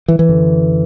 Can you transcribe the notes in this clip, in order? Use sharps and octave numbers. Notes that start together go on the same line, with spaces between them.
E3
E3
F#2 D3